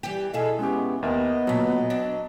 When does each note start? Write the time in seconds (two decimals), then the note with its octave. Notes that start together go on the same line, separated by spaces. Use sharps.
0.03 E3 G3 G4
0.33 B2 E4 G#4 A4 D#5 F5
0.59 G#3 B3 C#4 G4
1.03 D#2 B3 A#4 D#5 E5
1.47 D2 A#2 F#3 A5 B6
1.90 D4